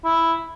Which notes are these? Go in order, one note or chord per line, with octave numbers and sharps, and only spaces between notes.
E4